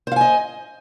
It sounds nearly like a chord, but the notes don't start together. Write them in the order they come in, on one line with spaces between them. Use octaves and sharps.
C5 F5 G#5 D#5